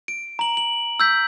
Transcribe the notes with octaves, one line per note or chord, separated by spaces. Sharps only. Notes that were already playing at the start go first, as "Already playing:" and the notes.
D7
A#5 F#7
F#7
E6 G6 B6